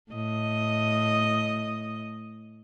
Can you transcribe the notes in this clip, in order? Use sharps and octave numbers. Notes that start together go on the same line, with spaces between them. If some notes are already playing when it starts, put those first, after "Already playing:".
A2 D#5